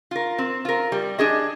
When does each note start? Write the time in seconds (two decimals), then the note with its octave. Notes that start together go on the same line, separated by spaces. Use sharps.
0.11 F4 A#4
0.38 C4
0.65 F4 A#4
0.92 G3
1.19 D4 G#4 D#5